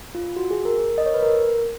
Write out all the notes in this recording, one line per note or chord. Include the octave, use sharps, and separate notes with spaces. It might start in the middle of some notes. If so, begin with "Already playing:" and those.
F4
F#4
G#4
A#4
D#5
C#5
B4
A#4